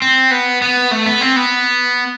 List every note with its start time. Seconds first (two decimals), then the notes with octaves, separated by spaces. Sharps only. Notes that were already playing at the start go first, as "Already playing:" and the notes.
0.02 C4
0.31 B3
0.62 B3
0.91 A3
1.06 B3
1.21 C4
1.36 B3